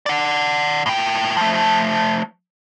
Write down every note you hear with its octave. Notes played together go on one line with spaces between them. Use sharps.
D5 F#5
A2 G5
F3 A3